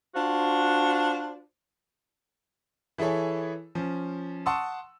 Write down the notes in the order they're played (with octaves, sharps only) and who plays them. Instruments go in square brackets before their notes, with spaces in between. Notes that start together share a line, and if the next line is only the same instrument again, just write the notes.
[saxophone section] D4 F4 F#4 C5
[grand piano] E3 E4 G#4 A4 C#5
F3 C#4
F#5 A5 C6 C#6 D#6 E6